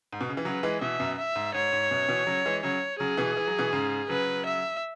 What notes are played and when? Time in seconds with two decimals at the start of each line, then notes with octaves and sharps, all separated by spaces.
0.13 G#2
0.21 B2
0.29 C#3
0.37 E3
0.45 C#3 F#3 B4
0.63 E3 G#3
0.81 B2 E3 E5
1.00 F#2 B2
1.19 E5
1.36 G#2
1.54 G#2 C#5
1.73 G#2
1.91 F#2 B2
2.09 B2 E3
2.27 C#3 F#3
2.45 E3 G#3
2.63 C#3 F#3 C#5
3.00 C#3 F#3 G#4
3.17 B2 E3
3.37 E3
3.47 F#3
3.59 B2 E3
3.73 G#2 C#3
4.09 C#3 F#3 B4
4.45 E5